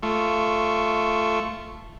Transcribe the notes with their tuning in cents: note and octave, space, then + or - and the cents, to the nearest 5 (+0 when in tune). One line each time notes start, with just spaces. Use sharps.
A3 -5 F4 -15 C#6 +0